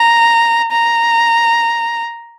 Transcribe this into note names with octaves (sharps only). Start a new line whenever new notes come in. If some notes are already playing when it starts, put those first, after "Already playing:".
Already playing: A#5
A#5